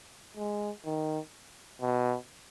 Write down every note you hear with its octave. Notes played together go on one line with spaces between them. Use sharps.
G#3
D#3
B2